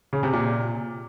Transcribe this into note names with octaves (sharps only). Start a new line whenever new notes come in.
C#3
C3
A#2